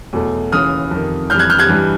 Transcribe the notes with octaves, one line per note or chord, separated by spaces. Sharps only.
E2 B2 F#3 A3
D#2 C#3 E3 D#6 F6
F2 C3 D#3
F2 C3 E3 G3 F6 G6
F#6 G#6
F6 G6
F#6 G#6
G2 E3 G3